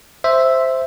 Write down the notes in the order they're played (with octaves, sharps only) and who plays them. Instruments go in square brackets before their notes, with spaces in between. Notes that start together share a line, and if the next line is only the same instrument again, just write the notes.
[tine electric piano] C5 E5